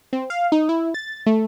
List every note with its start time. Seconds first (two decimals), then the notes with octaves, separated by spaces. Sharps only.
0.13 C4
0.30 F5
0.52 D#4
0.69 E4
0.94 A6
1.26 A3